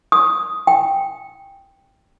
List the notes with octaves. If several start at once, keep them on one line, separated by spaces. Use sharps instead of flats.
D#6
G5